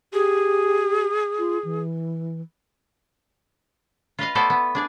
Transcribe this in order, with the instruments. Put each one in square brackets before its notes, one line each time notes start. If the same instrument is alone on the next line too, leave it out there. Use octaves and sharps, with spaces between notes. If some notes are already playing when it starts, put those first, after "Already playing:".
[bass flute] G4 [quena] G#4
[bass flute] F4
E3
[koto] F4 B4 D#5 F5
A3 B3 E4 A4 C5 D5
B3
D4 G#4 D5